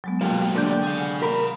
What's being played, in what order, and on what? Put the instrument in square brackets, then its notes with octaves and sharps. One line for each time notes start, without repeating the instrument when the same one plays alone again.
[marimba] F#3 G#3 B3
[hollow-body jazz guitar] B2 F3 [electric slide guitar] A#3 G4 A4
[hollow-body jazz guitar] D3 [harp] D5 G6
[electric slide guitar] G#4 F5
[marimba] F#5 G#5
[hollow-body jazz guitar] A#4 B5